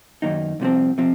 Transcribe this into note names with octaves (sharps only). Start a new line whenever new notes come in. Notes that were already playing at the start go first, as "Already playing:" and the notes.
F#2 D#3 A#3 D#4
C2 C3 F3 C4
C3 F3 C4